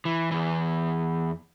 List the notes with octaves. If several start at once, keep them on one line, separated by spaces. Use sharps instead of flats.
E3
E2 E3